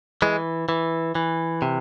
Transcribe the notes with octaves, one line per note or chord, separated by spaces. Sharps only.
E3 G#3
E3
E3
C3